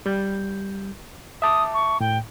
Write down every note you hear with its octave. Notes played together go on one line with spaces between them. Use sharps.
G3 G6
E5 A5 D6 D#6
C#6
A2 G5